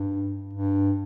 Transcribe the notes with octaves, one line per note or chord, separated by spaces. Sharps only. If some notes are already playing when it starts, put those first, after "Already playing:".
Already playing: G2
G2